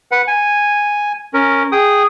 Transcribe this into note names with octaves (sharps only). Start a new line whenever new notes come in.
B4 F#5
G#5
C#4 A#4
G#4 G5 D#6